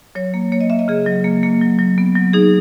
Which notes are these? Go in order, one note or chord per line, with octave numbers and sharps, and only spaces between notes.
F#3 C#5
A#3
A#3 C#5
D#5
A#3 E5
D#5
C#3 G#4
F#3
A#3
A#3
F#3
F#3
B3
F#3
D#4 G#4